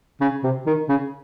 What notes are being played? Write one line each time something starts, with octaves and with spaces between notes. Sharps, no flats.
C#3
C3
D#3
C#3